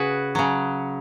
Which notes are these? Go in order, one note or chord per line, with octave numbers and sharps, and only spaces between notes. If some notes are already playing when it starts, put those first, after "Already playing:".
Already playing: C#3 F#4 G#4 B4
C#3 F#3